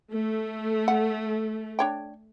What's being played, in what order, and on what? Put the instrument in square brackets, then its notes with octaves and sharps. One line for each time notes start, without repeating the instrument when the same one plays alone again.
[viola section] A3
[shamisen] F#5
D4 C#5 G5